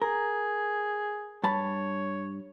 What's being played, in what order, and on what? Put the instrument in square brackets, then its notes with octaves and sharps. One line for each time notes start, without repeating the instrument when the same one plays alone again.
[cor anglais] G#4 [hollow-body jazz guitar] A#4
[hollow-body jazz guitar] G2 A5 B5 [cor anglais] C#5